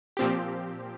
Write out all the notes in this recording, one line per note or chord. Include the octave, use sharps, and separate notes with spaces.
A#2 F3 C4 G4